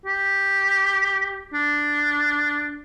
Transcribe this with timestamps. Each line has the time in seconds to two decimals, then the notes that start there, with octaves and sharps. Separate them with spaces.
0.06 G4
1.54 D4